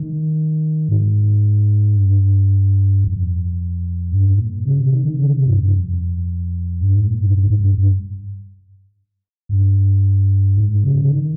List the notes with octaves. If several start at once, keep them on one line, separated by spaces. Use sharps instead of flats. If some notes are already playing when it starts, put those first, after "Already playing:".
Already playing: D#3
G#2
G2
F2
G2
A#2
C#3
C3
D#3
D#3
C#3
C3
G2
G2
F2
G2
G#2
A#2
G2
G2
G#2
G2
G2
G2
G#2
C#3
C#3
D#3